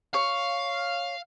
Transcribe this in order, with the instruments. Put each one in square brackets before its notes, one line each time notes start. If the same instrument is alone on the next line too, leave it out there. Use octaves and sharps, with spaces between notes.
[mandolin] C#5 [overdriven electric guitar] F5